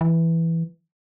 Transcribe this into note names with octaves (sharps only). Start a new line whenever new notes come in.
E3